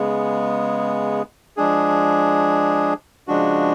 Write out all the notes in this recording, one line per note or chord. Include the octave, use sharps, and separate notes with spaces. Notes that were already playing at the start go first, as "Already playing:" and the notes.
Already playing: C#3 G#3 B3
F3 G#3 D4 G#4
C#3 F3 G#3 D4 F#4